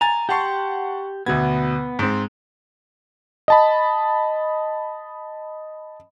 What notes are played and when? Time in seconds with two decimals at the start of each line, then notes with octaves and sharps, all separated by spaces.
0.01 G#5 A#5 A6
0.29 G4 F#5 A5 C6 C#6
1.26 D2 B2 B3 G#6
1.99 G#2 C4
3.48 D#5 A5 B5